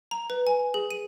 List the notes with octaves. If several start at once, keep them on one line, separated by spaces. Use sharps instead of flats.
A#5
B4
G#5
G#4
D#7